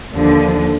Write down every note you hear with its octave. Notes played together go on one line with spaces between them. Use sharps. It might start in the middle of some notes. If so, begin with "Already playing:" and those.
D#2 D3 F3